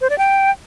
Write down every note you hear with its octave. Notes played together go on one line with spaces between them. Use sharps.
C5
D5
G5